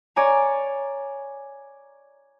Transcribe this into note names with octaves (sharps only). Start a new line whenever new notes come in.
C#5 D5 G#5 A#5